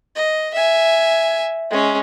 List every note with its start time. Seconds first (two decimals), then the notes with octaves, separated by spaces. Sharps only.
0.16 D#5
0.54 E5 G#5
1.71 G#3 C#4